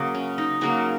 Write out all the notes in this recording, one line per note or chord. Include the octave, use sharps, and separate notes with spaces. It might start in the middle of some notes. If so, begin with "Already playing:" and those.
Already playing: C#3 F#3 A#3 F#4
C#4
D#4
C#3 F#3 A#3 G#4